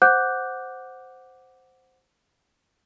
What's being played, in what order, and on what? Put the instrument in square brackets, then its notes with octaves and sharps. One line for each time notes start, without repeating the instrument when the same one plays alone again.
[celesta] C5 F#5 D6 F#6 G6